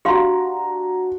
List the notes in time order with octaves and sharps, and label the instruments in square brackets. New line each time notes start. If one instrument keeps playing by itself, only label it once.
[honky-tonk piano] D4 F#4 A#5 [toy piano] G4 F5 C6